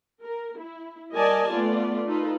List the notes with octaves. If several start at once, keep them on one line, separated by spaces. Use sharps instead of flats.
A#4
E4
G3 A#4 D5 D#5 G#5 A5
A3 B3 F4 D5
D#4 F4 A4 B4